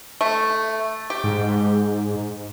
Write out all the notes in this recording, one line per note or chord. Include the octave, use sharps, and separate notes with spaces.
A3
G4
G#2